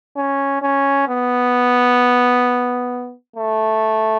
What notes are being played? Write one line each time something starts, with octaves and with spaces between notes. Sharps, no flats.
C#4
C#4
B3
A3